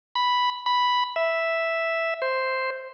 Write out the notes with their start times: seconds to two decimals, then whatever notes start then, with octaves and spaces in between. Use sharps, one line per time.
0.15 B5
0.66 B5
1.16 E5
2.22 C5